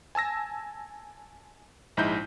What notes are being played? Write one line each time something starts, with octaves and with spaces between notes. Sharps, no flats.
G#5 A5 E6 A#6
A#1 G#2 D#4 E4 G6